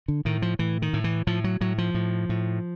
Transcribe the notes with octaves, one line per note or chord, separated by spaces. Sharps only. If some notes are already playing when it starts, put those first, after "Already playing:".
D3
A2 D#3
F3
A2 E3
D#3
A2
E3
A2 F3
F#3
A2 F#3
F3
A2
A2